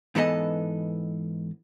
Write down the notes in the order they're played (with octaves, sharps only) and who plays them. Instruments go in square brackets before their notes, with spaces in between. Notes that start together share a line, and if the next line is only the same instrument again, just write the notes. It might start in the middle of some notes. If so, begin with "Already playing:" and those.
[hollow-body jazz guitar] G#2 E3 B3 A4 D#5